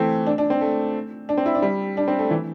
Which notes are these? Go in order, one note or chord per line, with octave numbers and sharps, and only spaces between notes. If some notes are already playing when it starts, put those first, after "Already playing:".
Already playing: E3 A3 C4
D4
D4
C4
A3
D4
C4
E4
D4
G3
D4
C4
A3
E3